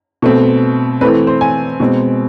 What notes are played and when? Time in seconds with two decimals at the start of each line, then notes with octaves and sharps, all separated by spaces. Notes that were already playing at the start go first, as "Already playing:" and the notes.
0.22 B2 A3 C4
1.01 E3 A3 C4 B4
1.27 C5
1.41 G#5
1.80 B2 G#3 C4